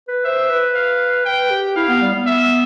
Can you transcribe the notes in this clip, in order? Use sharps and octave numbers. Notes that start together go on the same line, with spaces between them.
B4
C5 E5
B4
F5
B4 G5
G4
E4 F5
B3
G3
B3
E5